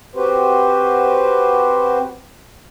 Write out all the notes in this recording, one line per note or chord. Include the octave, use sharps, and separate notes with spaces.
C4 F#4 G4 B4 C5